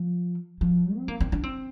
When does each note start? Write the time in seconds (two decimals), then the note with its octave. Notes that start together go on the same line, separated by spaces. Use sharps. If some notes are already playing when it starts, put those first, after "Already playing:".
Already playing: F3
0.61 F3
0.97 C4
1.08 A#3
1.20 C4
1.32 D4
1.44 C4